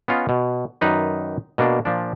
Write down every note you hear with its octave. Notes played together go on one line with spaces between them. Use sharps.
B3 C#4 F4 D#5
B2
F#2 D#3 D#4 B4 D5
B2 A#3 D4
A#2 F3 D4